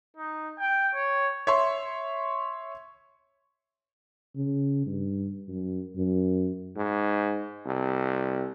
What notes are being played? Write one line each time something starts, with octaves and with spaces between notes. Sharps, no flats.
D#4
G5
C#5
C#5 E5 C6 C#6
C#3
G2
F#2
F#2
G#2
C2